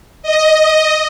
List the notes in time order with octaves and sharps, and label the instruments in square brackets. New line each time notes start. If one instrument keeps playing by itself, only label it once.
[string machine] D#5